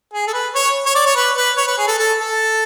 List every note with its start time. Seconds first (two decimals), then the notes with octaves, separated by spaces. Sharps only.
0.13 G#4
0.27 A4
0.33 B4
0.55 C#5
0.86 C#5
0.95 D5
1.06 C#5
1.16 B4
1.36 B4
1.57 C#5
1.67 B4
1.78 G#4
1.87 A4
1.98 A4
2.18 A4